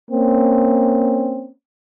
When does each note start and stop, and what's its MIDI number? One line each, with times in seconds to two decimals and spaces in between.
0.11 1.50 58
0.11 1.50 60
0.11 1.50 61